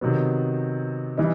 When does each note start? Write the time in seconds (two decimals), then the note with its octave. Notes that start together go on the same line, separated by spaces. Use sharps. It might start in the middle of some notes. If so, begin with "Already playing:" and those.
0.01 C3 D#3 F#3 B3
1.18 E3 G3 B3 D#4